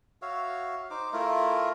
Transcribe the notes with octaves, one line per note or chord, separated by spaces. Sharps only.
F#4 C#5 E5 F5
D#4 C5 D6
A3 E4 F4 A#4